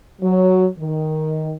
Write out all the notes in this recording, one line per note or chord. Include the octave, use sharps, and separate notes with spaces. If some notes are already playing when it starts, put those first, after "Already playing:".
F#3
D#3